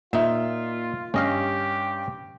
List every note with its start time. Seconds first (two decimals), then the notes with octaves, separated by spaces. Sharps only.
0.13 A#2 D#4 F4 E5
1.14 G2 C#4 G4 D#5 F5